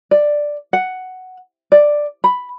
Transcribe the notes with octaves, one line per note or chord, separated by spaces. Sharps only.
D5
F#5
D5
B5